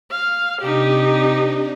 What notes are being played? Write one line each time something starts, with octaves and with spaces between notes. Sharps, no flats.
F5
C3 D4 D#4 G4